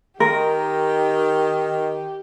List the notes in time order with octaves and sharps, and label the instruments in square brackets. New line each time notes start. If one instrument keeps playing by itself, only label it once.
[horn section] D#3 [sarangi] G4 [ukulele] A#4